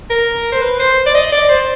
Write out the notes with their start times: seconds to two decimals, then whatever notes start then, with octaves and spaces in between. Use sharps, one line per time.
0.10 A#4
0.52 C5
0.61 B4
0.79 C5
1.06 D5
1.15 D#5
1.32 D5
1.49 C5